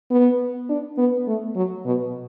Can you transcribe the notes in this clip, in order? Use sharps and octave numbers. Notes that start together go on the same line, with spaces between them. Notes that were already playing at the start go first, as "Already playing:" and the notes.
B3
D4
B3
A3
F#3
B2